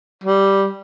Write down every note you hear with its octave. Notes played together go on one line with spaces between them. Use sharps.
G3